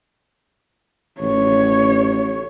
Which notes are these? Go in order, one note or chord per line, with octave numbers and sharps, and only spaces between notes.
A1 C#5